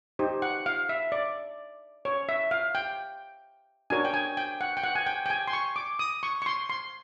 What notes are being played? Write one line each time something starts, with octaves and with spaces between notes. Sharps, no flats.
D#4 G4 C5
F#5
F5
E5
D5
C#5
E5
F5
G5
D4 F#4 A#4 C#5 G#5
G5
G#5
G5
F#5
G5
F#5
G#5
G5
G5
G#5
C6
C#6
D6
D#6
C#6
C#6
C6
C6